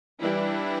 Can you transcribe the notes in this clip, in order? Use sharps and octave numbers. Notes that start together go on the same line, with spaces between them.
E3 G3 D4 E4